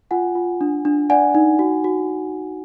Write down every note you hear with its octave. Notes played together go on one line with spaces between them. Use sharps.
F4 F#5 G#5
F4
D4
D4
D5 F#5 G#5
D#4
F#4
F#4